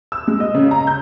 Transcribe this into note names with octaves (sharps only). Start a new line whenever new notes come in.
E6
G#3
D#5
C#3
A#5
G6